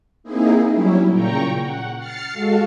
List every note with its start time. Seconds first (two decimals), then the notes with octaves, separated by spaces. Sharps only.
0.24 A#3 C4 D#4 E4 G#4
0.70 F#3 G3 C#4 E4
1.10 A#2 C#3 G5 A#5 C#6
1.59 F#5
1.98 F6 A6 C7 C#7
2.33 G#3 F#4 A4 F5